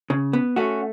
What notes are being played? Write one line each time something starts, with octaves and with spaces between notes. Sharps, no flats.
C#3
B3
A3 C#4 F#4